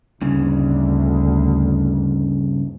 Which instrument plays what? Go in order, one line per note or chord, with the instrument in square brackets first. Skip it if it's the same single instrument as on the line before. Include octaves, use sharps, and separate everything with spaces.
[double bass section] D2 [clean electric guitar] G2 C#3